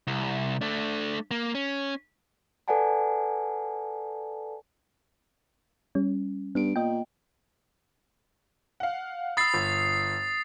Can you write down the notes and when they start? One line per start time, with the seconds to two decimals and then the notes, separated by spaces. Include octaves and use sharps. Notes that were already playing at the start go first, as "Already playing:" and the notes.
0.07 C2
0.61 A3 D4
1.31 A#3
1.55 C#4
2.68 A4 B4 D5 F#5 G#5 A5
5.95 G3 C#4
6.55 G2 B3 D7
6.76 A#2 D#5 G5
8.80 F5 F#5
9.37 B5 D#6 E6 A6 C7
9.54 G1